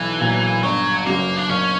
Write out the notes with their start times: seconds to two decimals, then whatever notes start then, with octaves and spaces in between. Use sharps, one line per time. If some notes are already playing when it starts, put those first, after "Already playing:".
Already playing: B1 E3
0.21 A#2 F#3
0.63 G1 F#3
1.06 F#2 C#3 A#3
1.37 D4
1.49 F#1 C#4